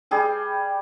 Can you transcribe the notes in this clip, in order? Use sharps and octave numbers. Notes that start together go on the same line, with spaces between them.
G3 G#4 G5